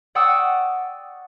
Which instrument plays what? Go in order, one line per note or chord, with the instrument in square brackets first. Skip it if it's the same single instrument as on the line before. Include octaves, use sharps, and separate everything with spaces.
[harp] D5 F#5 G5 C#6 D#6 E6